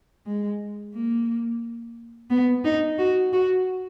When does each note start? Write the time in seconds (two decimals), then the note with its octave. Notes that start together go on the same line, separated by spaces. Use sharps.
0.26 G#3
0.94 A#3
2.30 B3
2.64 D#4
2.99 F#4
3.33 F#4